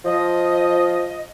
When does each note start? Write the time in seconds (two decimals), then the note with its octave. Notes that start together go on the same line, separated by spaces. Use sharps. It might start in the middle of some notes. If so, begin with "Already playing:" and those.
0.05 F3 D#5